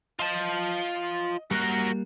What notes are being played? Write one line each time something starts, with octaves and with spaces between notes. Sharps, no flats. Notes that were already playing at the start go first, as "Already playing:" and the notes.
F4 D#5 A5
G3 A#3 F#4 A#4 F#6